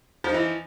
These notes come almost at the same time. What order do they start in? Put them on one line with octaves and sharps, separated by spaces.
F3 D#4 E3